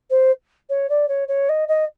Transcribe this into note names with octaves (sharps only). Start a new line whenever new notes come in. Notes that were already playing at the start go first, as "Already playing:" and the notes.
C5
C#5
D5
C#5
C#5
D#5
D#5